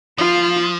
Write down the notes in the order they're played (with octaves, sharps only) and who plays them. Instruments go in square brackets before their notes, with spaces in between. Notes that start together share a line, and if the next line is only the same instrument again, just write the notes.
[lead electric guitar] F3 [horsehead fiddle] F4